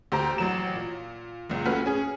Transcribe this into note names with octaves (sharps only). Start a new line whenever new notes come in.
D2 G4 C5 A#5
A1 F#3 E7
A#2
F#1 C#2
A3 C#4 F#4 B4 F6
C#4 G#4